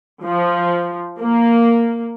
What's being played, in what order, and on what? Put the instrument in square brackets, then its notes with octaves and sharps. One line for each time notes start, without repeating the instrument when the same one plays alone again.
[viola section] F3
A#3